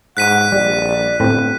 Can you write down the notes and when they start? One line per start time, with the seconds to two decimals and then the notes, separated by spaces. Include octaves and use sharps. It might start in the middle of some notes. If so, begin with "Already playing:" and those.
0.17 G#2 F#5 F#6 B6 D#7
0.52 A#1 G3 D5
1.20 G1 A2 C4